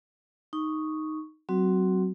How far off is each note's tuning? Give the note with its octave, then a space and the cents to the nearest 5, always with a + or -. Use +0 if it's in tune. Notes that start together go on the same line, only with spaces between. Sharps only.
D#4 +0 C#6 +0
F#3 +30 C4 +0 F#4 +0